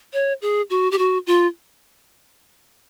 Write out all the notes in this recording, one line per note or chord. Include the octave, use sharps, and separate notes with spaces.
C#5
G#4
F#4
G4
F#4
F4